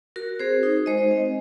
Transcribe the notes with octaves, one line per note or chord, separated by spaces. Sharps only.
F#4 A#4
C4 G#4 C5
D#4
G#3 C5 D#5
C4